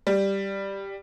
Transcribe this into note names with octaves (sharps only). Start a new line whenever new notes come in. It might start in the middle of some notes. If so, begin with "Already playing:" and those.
G3